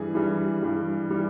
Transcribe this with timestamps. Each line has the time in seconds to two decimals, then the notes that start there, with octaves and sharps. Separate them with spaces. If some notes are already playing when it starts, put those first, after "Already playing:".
Already playing: G2 E3 G3 G#4
0.14 G2 E3 G3
0.62 G2 E3 G3
1.10 E3 G3